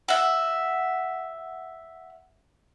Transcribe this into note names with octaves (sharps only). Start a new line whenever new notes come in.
F#4 E5